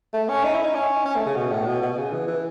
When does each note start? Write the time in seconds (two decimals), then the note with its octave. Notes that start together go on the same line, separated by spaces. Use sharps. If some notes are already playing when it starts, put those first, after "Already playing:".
0.14 A3
0.29 C#4
0.44 D#4
0.55 E4
0.65 D#4
0.75 C#4
1.05 C#4
1.16 A3
1.26 C#3
1.36 B2
1.52 A2
1.67 B2
1.82 B2
1.93 B2
1.97 C#3
2.13 E3
2.28 E3